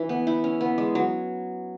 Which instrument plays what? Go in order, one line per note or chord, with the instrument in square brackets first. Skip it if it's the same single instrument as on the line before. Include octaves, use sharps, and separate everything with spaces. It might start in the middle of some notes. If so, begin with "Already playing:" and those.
Already playing: [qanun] E3
B3
E4
C#4
B3
G#3
F#3